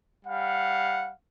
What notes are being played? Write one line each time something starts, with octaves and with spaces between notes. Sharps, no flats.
G3 F5 F#5